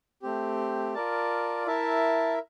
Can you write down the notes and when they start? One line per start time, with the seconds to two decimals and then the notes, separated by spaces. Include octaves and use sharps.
0.22 A3 C4 G4
0.94 F4 A#4 D5 A5
1.66 E4 A#4 E5 A5